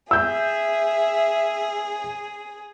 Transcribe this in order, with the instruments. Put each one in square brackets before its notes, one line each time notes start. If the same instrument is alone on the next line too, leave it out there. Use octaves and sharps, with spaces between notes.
[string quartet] G#4 [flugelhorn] E5 [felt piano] E6 G6